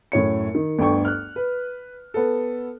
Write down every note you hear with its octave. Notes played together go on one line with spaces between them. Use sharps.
F#2 A2 C#5 C#7
D#3
G1 D2 G5 C#6
F6 F#6
B4
B3 A4